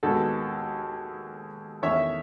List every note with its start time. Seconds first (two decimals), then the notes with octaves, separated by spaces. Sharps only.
0.03 D#2 D#3 G#3 B3 F#4 A4
1.82 E2 D#3 A3 C#4 C#5 E5